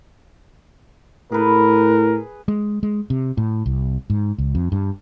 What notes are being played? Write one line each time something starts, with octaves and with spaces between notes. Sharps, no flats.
A2 G#4 A#4 B4
G#3
G#3
C3
A2
C2
G#2
C#2
F2
G2